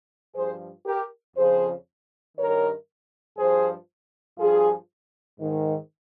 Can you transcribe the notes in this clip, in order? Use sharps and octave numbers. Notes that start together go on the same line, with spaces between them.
G2 F3 G#4 C5
G4 A#4
F2 C#3 F3 G#4 C5
G2 D#3 A#4 C#5
G2 F3 G#4 C5
G2 F3 F4 G#4
G#2 D#3